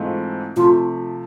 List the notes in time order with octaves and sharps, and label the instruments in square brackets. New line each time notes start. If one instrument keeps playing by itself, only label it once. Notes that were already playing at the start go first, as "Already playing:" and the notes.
Already playing: [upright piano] G#2 E3 A3 C4 F4
[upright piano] C3 F3 A3 [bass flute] F4